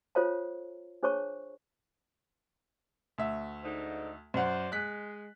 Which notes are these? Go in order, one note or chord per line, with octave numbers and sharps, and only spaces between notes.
F4 A4 C5 C#5 F5 A5
D4 G#4 C5 C#5 A5 C#6
D2 E5
G#2 D3 D#4
F#2 C5 D5 F#5
G#3 F#6 B6